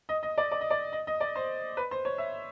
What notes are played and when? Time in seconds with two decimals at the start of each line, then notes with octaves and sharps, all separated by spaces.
0.09 D#5
0.23 D#5
0.38 D5
0.51 D5
0.61 D#5
0.70 D5
0.93 D#5
1.07 D#5
1.20 D5
1.36 C5
1.77 B4
1.91 C5
2.05 C#5
2.18 E5